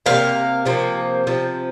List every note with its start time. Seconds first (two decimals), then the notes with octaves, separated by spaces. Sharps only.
0.06 C3 F3 A#3 F5
0.65 C3 F3 A#3
1.27 C3 F3